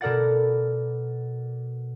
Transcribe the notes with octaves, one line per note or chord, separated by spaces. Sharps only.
B2 A4 A#4 D5 F#5 A6